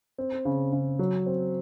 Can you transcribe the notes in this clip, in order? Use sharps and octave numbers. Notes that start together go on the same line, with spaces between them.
C4
C#3
C#3
F#3
C4